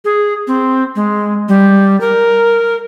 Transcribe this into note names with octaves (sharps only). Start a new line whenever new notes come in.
G#4
C4
G#3
G3
A#4